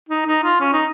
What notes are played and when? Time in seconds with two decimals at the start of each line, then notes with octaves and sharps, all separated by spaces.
0.09 D#4
0.27 D#4
0.44 F4
0.60 C#4
0.73 D#4